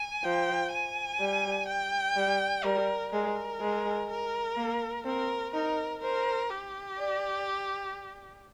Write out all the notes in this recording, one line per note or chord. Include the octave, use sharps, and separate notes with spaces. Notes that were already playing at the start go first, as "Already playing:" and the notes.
Already playing: G#5
F3 G5
G#5
G3
G5
G3
G3 A#4
G#3 A#4
G#3
A#4
A#3
C4 A#4
D#4 A#4
A#4 C5
G4
D5